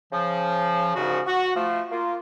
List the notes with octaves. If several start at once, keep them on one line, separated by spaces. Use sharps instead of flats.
C#3 F3
C2 G#2 C#3 C#4 F#4
F#4
F3 A3
A#3 F4